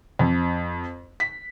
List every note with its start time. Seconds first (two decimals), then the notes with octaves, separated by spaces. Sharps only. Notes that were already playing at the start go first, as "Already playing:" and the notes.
0.19 F2
1.20 B6